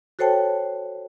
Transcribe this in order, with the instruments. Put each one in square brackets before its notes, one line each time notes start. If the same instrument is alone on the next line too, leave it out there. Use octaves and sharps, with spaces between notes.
[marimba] F#4 A4 C5 C#5 G5 A5